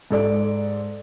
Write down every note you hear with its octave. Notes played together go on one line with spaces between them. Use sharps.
G#2 A4 D5